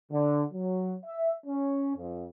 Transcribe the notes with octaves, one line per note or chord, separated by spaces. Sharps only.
D3
F#3
E5
C#4
F2